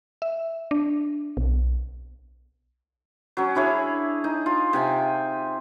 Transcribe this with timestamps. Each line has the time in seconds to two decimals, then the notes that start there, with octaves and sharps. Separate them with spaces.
0.22 E5
0.71 D4
1.37 B1
3.37 F#3 C#4
3.55 D4 E4 G#4 C#5
4.24 D#4
4.46 F4
4.73 C3 G5 G#5